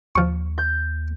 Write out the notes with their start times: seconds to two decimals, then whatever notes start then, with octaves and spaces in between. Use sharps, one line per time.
0.16 D#2 F3 C#6
0.58 G6